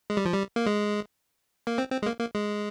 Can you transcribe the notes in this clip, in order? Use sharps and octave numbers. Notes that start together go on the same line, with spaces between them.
G#3
G3
F3
G3
A#3
G#3
A#3
C4
C4
G#3
A#3
A#3
G#3